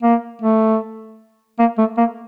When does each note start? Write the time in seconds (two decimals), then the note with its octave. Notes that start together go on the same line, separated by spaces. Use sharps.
0.02 A#3
0.42 A3
1.59 A#3
1.78 A3
1.97 A#3